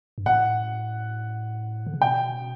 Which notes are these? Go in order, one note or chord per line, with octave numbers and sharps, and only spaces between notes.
G2
A2 F#5
D3
C#3
B2 G5